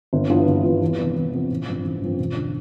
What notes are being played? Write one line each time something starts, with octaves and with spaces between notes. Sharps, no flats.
G1
G2 E3 B3 F4
G1
G2 E3 B3 F4
E2
C3 F3 B3
E2
C3 F3 B3
A1
G2 F3 C4
A1
G2 F3 C4
E1
D3